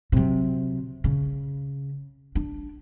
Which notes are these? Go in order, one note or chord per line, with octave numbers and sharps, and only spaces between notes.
C3 F#3
C#3
D4